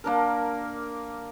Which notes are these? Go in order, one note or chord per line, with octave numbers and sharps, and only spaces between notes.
A#3 D4 A#4